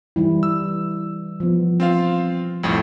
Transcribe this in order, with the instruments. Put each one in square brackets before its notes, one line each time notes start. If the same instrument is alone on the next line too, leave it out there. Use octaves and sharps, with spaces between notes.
[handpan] E3 G3 E4
[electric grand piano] E6
[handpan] F3 B3
[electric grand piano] C4 F4 F5
C2 F2 A2